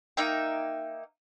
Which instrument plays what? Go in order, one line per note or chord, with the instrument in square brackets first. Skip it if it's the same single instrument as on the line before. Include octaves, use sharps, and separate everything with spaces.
[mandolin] A#3 D#4 E5 G5